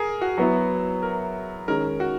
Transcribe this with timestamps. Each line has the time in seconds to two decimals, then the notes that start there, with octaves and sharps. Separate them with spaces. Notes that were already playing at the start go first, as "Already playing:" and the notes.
Already playing: G#4 A#4
0.21 F#4
0.38 F#3 B3 E4 F#4
1.03 A#4
1.68 D#3 G#3 C#4 A#4
2.00 F#4